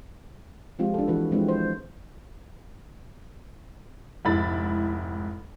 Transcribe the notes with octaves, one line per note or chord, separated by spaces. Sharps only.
F3 G#3 C4 F4 G4
D4 A4
E3 F#4 B4
F3 G#3 C4 D4 E4 B4
F3 C5
F1 G#2 E4 B5 A6